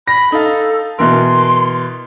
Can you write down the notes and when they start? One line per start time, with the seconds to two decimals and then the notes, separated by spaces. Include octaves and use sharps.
0.08 B5 A#6
0.32 D#4 A4 F5
0.99 B2 E3 A#4 C6